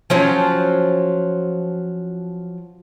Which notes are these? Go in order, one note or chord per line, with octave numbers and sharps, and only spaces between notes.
F3 F#3 C#4